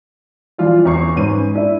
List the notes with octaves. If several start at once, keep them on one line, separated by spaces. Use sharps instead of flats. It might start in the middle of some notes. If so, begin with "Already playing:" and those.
E3 F3 F4 D5
E2 C#6 C7
G#2 C#4 B4 D#7
D4 E4